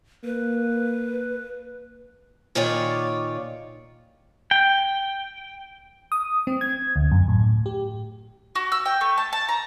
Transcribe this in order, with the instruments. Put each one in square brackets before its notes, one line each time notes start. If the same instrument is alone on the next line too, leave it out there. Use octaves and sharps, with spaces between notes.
[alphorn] A#3 [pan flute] B4
[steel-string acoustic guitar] A#2 D#3 F4 C#5 D5
[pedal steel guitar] G5
[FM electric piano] D#6
C4
G#6
D2
F#2
A2
G4
[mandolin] F#4
E6
G5
A3
A5
A5
A#5